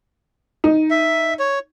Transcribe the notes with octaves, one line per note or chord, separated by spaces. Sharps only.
D#4
E5
C#5